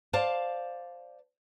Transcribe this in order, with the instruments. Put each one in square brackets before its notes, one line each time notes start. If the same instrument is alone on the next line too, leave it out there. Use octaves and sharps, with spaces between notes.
[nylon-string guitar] C5 D5 F5 A5